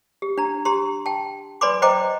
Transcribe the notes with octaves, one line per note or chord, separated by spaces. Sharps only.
G4
D4 A#5
G4 A#5 C6
G5 A5
B4 D5 G#5 B5 C6 D6
C5 D#5 G5 A#5 D6